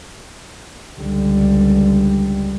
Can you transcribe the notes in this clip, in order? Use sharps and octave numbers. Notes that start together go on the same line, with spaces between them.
C#2 D3 G3